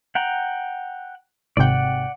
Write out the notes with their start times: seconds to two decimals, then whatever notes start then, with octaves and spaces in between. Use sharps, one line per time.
0.15 F#5 G5 A#5
1.57 G#1 C3 D5 F#5 G5